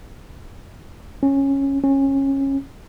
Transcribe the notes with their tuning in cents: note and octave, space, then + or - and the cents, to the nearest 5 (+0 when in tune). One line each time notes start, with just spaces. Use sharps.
C#4 -10
C#4 -20